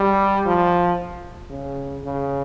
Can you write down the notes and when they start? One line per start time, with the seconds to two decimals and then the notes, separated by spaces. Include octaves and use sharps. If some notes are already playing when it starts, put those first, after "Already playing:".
Already playing: G3
0.46 F3
1.50 C#3
2.03 C#3